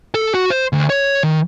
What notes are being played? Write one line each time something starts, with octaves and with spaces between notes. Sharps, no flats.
A4
F#4
C5
D2
C#5
D#3